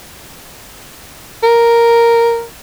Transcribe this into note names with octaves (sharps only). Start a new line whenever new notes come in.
A#4